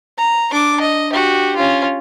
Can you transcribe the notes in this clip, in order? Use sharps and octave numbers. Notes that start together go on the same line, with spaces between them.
A#5
D4 D6
D#5
F#4 G4
C#4 F4